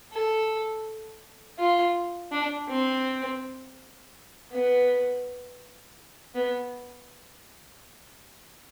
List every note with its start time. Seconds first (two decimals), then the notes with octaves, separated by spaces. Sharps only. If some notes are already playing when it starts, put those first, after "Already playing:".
0.13 A4
1.59 F4
2.32 D4
2.68 C4
4.52 B3
6.35 B3